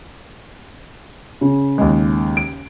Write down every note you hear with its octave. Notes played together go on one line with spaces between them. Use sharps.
C#3
D#2 G#3
D7